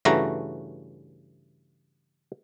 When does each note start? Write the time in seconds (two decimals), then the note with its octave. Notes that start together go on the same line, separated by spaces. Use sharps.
0.05 G2 C#3 E3 A3 F#4 A#5